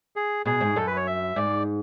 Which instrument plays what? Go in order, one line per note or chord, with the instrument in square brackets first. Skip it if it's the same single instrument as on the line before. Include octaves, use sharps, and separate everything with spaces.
[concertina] G#4
[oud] B2 [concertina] G#4
[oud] G#2
[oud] F#2 [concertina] A4
[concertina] B4
C#5
E5
[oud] G#2 [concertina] D5